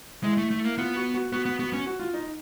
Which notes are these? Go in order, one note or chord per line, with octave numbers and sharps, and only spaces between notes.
G#3 E4
A3
A3 E4
A#3
B3 F4
F#4
F#4
B3 F#4
B3
B3 F#4
C#4
F#4
F4
D#4